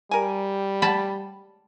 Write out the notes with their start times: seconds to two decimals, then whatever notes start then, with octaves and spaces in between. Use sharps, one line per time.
0.11 G3 A#4 G#5
0.82 A5 B5